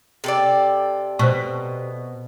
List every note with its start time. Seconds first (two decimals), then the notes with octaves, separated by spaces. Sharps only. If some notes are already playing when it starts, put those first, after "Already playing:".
0.24 C3 A4 D5
1.19 B2 C5 C#6